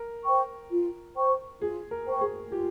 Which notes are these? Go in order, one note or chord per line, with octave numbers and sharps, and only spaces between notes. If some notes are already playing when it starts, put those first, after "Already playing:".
Already playing: A#4
C5 G5 C#6
F4
C5 G5 C#6
F4 G#4
A#4
C5 G5 C#6
G#4
F4 G4